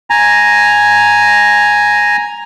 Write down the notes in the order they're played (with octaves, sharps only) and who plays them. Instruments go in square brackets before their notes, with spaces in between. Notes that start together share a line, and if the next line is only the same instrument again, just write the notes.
[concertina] G#5 A#5